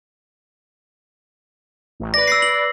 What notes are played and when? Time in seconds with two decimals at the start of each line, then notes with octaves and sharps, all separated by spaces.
2.00 A1
2.14 B4 D5 A#6
2.27 E6 A#6 C7
2.42 F#7